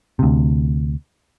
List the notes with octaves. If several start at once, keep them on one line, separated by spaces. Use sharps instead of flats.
D2 C3